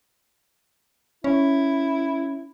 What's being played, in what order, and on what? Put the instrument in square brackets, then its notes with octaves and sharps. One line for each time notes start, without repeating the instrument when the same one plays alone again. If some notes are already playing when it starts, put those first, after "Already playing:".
[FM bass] C#4 [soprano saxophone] E4